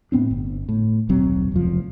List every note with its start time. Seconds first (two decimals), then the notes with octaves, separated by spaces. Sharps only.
0.12 A2 B3 C4 D4
0.31 G1
0.69 A2
1.09 D#1 B1 F#3 C4
1.52 F1 C#2 F3